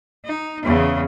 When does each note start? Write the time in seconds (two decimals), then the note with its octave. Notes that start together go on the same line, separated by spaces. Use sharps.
0.25 D#4
0.64 E2 C#3